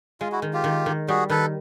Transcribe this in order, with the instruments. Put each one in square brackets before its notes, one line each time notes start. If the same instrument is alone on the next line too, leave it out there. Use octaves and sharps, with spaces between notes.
[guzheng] G#3 [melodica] F4
[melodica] E4 F#4
[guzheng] D#3
[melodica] F4 G4
[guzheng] D#3
D#3
[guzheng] G3 [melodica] F#4 G#4
[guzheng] D#3 [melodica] A4 B4